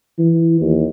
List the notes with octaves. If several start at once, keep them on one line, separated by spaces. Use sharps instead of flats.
E3
D#2